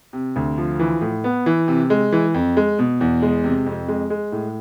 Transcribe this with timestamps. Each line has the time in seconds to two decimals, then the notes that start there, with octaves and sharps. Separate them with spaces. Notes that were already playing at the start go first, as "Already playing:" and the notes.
0.13 C3
0.36 D2
0.58 F3
0.79 E3
1.01 A2
1.24 B3
1.46 E3
1.68 C3
1.90 G#3
2.12 E3
2.34 F2
2.57 G#3
2.79 B2
3.01 E2
3.22 G#3
3.44 C3
3.66 F2
3.88 G#3
4.10 G#3
4.32 A2